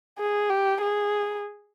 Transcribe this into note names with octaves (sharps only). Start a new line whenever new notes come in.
G#4
G4
G#4